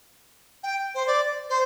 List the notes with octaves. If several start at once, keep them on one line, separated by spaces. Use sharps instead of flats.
G5
C5
D5
C5